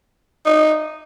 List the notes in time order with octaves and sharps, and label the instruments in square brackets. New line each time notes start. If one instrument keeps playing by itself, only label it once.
[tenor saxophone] D#4